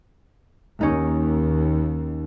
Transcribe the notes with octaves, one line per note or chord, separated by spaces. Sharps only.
D#2 C#4 D#4